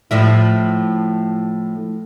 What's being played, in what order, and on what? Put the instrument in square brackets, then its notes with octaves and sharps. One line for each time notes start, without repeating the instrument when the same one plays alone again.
[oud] A2 F3 E4